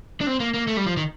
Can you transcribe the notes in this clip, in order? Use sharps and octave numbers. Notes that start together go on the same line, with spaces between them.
D4
C4
A#3
A#3
A3
G3
F3
D#3